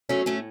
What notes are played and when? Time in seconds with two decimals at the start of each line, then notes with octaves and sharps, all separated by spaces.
0.09 F#3 A3 C#4
0.26 A2 A3 C#4